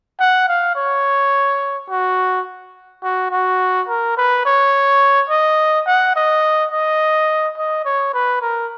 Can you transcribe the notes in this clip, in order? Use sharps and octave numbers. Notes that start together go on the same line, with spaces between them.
F#5
F5
C#5
F#4
F#4
F#4
A#4
B4
C#5
D#5
F#5
D#5
D#5
D#5
C#5
B4
A#4